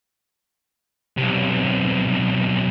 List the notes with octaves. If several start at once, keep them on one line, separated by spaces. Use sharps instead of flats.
B1 C3